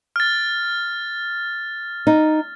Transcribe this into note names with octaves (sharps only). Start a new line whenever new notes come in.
F6 A6
D#4